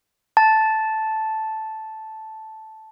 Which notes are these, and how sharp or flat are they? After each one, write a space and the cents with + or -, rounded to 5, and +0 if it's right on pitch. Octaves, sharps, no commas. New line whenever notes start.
A5 -5